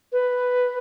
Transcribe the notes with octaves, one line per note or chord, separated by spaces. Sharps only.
B4